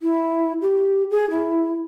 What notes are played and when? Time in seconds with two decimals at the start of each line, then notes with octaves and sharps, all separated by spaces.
0.02 E4
0.62 G4
1.11 G#4
1.31 E4